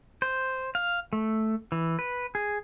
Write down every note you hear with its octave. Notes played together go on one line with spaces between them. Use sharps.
C5
F5
A3
E3
B4
G#4